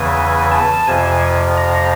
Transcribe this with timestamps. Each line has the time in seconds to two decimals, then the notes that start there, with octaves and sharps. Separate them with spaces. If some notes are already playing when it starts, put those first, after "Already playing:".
Already playing: E2 C#3 E3 G#5
0.51 A5
0.87 F2 C3 F3 G#5
1.57 A#5